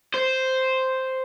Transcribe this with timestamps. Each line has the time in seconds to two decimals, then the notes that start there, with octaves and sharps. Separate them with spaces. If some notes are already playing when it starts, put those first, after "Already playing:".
0.14 C5